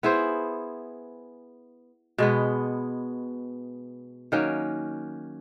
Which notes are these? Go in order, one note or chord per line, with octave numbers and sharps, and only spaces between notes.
B3 E4 G#4 C5
B2 G#3 B3
D#3 F#3 A#3 C#4